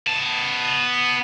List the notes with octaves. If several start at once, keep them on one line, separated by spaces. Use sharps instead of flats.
B3 A5